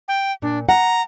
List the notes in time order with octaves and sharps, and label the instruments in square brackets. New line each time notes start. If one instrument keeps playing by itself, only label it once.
[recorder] G5
[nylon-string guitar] A#2 [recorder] D4
[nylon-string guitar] F#5 [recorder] A#5